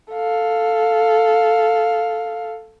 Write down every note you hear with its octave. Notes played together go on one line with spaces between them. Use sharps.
A4 F5